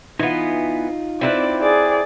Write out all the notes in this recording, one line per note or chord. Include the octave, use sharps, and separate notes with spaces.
E3 B3 D#4 F4
C4 E4 B4 D5
G#4 D5